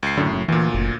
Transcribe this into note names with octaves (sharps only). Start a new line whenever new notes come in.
C#2 C7
F#2 A2 D3
F#1
D2 A#2 E3
F#1